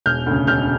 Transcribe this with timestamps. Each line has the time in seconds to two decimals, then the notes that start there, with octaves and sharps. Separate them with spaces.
0.06 E1 F6 G6
0.26 D2 C#3
0.47 E1 F6 G6